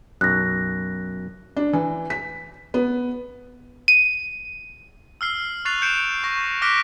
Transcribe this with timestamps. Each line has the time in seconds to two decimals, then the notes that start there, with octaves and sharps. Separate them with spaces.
0.21 B1 F#2 F#6 A#6
1.57 D4
1.73 E3
2.10 B6
2.74 B3
3.88 D#7
5.21 E6 F6 C7
5.65 C#6 F#6 A6 C7 F7
5.82 G6 C#7 D7 E7 F7
6.24 C#6 A#6
6.62 D6 F6 F#6 A#6 B6 D7